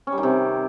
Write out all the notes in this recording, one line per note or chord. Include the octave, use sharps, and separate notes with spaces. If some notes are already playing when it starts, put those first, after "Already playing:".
C#4
G3
D#3
C3